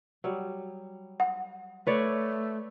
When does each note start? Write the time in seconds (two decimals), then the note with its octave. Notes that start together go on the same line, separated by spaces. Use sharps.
0.24 F#3 G3
1.20 F#5
1.87 A3 B4 C#5 D5